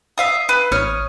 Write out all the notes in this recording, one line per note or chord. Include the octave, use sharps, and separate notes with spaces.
E5 F5 D#6
B4
A1 C#5 D#6 F6